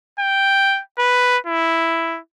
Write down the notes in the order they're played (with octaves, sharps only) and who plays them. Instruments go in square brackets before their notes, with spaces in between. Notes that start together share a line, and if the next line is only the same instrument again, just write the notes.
[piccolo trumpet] G5
B4
E4